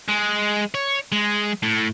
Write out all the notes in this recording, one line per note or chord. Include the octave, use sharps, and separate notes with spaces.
G#3
C#5
G#3
A2